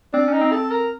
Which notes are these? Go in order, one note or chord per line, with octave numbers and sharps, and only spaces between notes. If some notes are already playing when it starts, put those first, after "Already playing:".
C4 D4
C#4
D#4
C4
A4
A#4